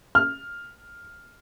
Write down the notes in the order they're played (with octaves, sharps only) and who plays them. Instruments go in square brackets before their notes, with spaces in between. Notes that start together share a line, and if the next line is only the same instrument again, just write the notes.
[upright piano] F6